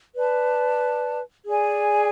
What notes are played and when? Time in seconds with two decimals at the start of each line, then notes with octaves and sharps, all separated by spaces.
0.16 B4 D5 A5
1.46 G#4 D5 G#5